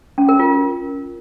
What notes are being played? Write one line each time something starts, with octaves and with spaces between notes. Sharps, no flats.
C#4
A#4
F4